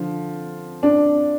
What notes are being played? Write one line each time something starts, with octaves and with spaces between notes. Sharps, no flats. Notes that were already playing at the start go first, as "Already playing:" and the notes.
Already playing: D3 F3
D4